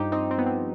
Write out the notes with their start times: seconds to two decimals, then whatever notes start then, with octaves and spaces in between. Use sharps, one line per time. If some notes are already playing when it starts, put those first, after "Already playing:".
Already playing: G2 F3 D#4 G4
0.12 C4 D#4
0.31 C4
0.38 B3
0.46 C4